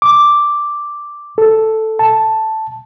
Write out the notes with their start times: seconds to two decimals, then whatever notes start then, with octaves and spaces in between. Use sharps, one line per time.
0.02 D6
1.38 A4
1.99 A5